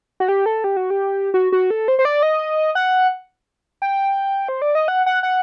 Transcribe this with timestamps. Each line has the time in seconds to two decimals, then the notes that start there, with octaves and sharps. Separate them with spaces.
0.20 F#4
0.28 G4
0.46 A4
0.64 G4
0.77 F#4
0.90 G4
1.34 F#4
1.52 F#4
1.70 A4
1.88 C5
1.99 C5
2.05 D5
2.23 D#5
2.75 F#5
3.82 G5
4.49 C5
4.62 D5
4.75 D#5
4.88 F#5
5.06 F#5
5.23 F#5